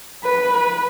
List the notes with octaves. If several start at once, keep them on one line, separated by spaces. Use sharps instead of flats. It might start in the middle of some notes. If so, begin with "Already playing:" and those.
B4
B4